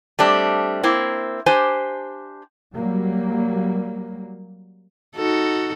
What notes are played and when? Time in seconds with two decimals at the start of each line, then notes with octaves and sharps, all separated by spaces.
0.19 G3 A3 C4 D4
0.83 A#3 C4 E4
1.46 D4 G4 C5 G#5
2.74 F#3 G3 A#3
5.16 D#4 F#4 A4